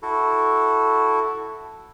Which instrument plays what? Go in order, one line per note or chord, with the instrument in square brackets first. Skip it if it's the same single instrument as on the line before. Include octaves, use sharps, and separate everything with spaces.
[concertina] E4 F#4 A4